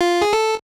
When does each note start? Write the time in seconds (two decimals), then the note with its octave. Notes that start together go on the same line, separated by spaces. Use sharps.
0.01 F4
0.22 G#4
0.33 A4